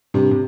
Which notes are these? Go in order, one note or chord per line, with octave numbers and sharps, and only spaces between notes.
G2 C3
C3